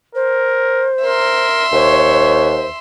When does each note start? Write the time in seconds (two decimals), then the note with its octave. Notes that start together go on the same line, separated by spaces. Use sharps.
0.15 A#4 C5
1.04 A#4 E5 C6
1.73 D#2 C5 C#5